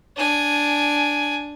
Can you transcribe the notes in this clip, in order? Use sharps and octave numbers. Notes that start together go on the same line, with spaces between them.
D4 G#5